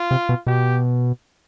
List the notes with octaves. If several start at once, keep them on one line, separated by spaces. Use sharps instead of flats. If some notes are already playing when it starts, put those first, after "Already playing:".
Already playing: F4
C3
B2
B2 G4